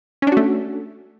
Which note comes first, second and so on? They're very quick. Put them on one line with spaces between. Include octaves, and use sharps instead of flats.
C#4 D4 F#4 A3